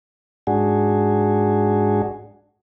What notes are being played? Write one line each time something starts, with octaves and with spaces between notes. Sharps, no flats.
G#2 D4 F#4 G#4